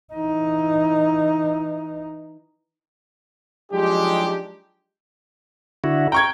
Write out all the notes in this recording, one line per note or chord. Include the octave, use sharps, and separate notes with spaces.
E3 D#4
F3 F#3 G#3 D4 D#4 G4
D3 E4 F#4
G5 A#5 C#6 G#6